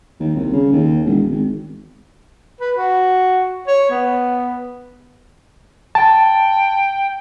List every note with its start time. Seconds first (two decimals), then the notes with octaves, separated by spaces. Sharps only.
0.20 D#2
0.36 C2
0.52 C#3
0.73 D#2
1.05 E1
1.30 G#1
2.61 B4
2.77 F#4
3.67 C#5
3.90 B3
5.95 G5 A5